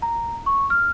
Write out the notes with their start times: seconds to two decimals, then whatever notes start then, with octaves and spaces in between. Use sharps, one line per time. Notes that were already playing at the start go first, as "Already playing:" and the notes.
0.02 A#5
0.46 C#6
0.70 F6